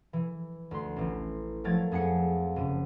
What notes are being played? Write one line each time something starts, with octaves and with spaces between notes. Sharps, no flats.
E3
D2 C6
A1 E3
F3 F#3 A3 A#4 G#6 A6
F2 G#4 F#5 G#5 C#7
F#1 D#7